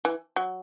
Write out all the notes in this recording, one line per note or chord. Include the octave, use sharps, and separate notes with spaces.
E3
F#3